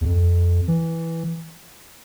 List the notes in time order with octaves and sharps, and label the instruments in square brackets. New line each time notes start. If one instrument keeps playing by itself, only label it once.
[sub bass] E2
F2
E3